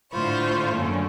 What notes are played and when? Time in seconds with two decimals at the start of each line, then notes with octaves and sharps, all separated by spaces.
0.13 A2 D3 F4 C5 B5 C#6
0.76 F#2 D3 A#3 C#4